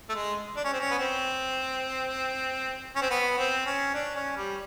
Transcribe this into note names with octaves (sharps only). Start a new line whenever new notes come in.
A3
G#3
D4
C#4
C4
C#4
B3
C4
C#4
C4
B3
C4
C#4
D4
C#4
G3